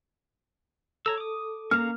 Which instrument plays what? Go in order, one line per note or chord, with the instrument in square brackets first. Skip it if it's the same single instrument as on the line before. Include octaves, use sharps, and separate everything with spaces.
[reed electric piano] A4 [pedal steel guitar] C#5 A#5 E6
[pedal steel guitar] D6 D#6
[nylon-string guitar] A#3 [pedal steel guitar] C#4 F5 A#5 [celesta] F6